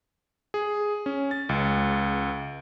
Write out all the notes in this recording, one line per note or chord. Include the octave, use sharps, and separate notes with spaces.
G#4
C#4
A6
C#2